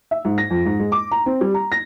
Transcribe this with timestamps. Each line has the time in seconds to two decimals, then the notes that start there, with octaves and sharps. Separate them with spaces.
0.11 E5
0.25 G#2
0.38 A#6
0.50 F2
0.66 G#2
0.80 G#3
0.92 D6
1.12 A#5
1.26 C4
1.41 G3
1.54 A#5
1.72 A#6